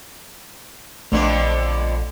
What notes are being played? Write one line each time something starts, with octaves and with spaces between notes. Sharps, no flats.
A#1 F2 D3 A3 B3